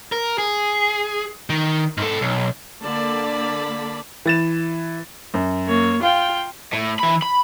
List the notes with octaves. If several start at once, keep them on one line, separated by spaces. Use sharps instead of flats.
A#4
G#4
D#3
G#2 A4
B1
D3 A#3 D5 A5 B5
E3 A6 E7
F#2
A#3 C#5
F4 F5 G5
A2
E3 B5
B5